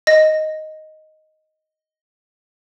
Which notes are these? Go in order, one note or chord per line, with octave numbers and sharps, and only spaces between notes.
D#5 A#6